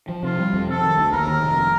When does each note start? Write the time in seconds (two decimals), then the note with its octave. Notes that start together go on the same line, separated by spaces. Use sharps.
0.09 F3
0.23 C3 F4
0.39 G3
0.53 F2
0.68 C3 A4
0.83 D#3
0.98 D2
1.12 D#2 A#4
1.27 D#3
1.42 F1